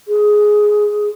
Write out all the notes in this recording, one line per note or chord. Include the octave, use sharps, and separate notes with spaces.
G#4